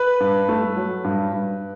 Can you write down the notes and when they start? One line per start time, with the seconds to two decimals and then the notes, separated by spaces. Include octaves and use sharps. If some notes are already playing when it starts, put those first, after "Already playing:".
Already playing: B4
0.20 G2
0.49 A3
0.76 F#3
1.04 G2
1.33 G2